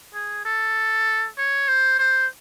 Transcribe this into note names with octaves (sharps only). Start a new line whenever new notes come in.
G#4
A4
C#5
C5
C5